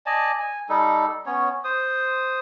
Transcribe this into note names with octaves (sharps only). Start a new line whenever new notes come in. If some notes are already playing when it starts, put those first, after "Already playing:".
D5 D#5 G#5 A5
G#5
G3 D#4 A4
B3 C#4 C#5
C5 D#6